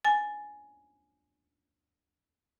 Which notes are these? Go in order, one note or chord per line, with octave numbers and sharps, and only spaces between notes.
G#5 A6